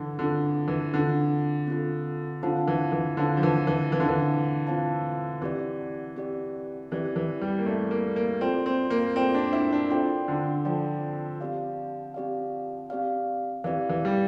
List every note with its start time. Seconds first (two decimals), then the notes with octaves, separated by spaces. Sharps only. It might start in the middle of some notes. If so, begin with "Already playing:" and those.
Already playing: D3 E3
0.19 D3 C4 F4 A4
0.68 E3
0.93 D3 C4 F4 A4
1.67 C4 F4 A4
2.43 D3 C4 F4 C5 F5 A5
2.68 E3
2.92 E3
3.17 D3 C4 F4 C5 F5 A5
3.37 F3
3.43 E3
3.67 E3
3.92 E3 C4 F4 C5 F5 A5
4.00 D3
4.09 E3
4.67 C4 F4 C5 F5 A5
5.42 E3 C4 G4 D5
6.16 C4 G4 D5
6.91 E3 C4 G4 D5
7.16 E3
7.41 G3
7.59 A#3
7.66 A3 C4 G4 D5
7.91 A#3
8.16 A#3
8.41 C4 F4 A4 D5 G5
8.66 C4
8.90 A#3
9.16 C4 F4 A4 D5 G5
9.34 D4
9.53 E4
9.72 D4
9.90 C4 F4 A4 D5 G5
10.28 D3
10.65 F3 F4 A4 D5 G5
11.41 C4 G4 D5 F5
12.14 C4 G4 D5 F5
12.90 C4 G4 D5 F5
13.64 E3 C4 G4 D5 F5
13.89 E3
14.05 G3